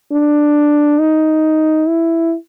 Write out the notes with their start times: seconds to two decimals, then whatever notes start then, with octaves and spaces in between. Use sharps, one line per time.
0.12 D4
1.00 D#4
1.88 E4